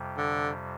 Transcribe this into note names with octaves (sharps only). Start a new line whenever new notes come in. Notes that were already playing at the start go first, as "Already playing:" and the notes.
Already playing: F2 C3 G3
D3